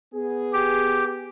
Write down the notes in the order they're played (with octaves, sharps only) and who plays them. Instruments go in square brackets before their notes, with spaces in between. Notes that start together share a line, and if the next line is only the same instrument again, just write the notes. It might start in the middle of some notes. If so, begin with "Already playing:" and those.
[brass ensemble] B3 G#4
[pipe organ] G4